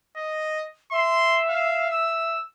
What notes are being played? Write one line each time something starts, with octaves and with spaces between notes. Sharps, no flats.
D#5
E5 C6
F5
E6